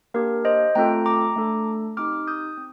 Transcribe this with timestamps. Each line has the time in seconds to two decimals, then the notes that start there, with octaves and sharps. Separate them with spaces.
0.14 A#3 D4 G4 A#4
0.45 C5 D#5
0.75 A3 C4 F4 A4 G5 A#5
1.06 A#5 D6
1.36 A3 D4 A4
1.97 C4 D#4 G4 D6 F6
2.27 D#6 G6
2.57 C4